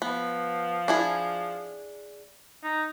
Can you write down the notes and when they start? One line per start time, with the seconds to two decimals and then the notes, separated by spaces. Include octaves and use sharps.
0.02 F3 B3
0.88 D4 E4 G#4
2.63 D#4